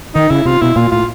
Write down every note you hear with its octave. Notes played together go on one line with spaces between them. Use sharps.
D#3 D#4
C#3 E4
C3 F4
B2 E4
A#2 F4
A2 F4